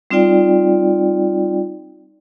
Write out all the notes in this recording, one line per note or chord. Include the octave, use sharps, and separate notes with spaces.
G3 C4 D#4 F4 D5 G5